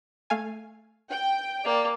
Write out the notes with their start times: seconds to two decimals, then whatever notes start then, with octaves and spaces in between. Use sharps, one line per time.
0.30 A3 F5 G#5
1.11 G5
1.65 A#3 D5